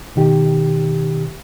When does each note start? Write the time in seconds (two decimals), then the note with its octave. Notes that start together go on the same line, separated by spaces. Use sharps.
0.16 B2 D#3 G4